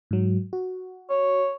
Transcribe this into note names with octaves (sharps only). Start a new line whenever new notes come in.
G#2 F#3
F#4
C#5